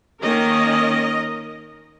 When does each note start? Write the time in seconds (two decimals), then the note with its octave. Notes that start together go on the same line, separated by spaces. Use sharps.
0.22 D#3 A#3 C#4 A#4 D#5